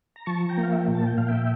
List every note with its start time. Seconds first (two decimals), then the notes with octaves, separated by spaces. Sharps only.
0.16 A#5
0.26 F3 A5 C#6
0.49 G5 A#5
0.57 A#3
0.63 F5
0.72 E5 G5
0.88 A#2
0.95 A5
1.06 G5
1.17 A#2 F5
1.28 E5 G5